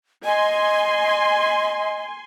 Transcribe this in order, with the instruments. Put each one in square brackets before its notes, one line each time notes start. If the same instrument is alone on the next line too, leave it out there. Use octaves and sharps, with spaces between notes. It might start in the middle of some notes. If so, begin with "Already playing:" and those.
[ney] D#5 [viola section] G#5 C6